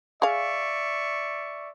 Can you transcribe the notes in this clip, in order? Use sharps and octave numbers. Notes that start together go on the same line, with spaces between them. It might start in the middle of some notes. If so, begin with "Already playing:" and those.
G#4 D5 E5 F5 C#6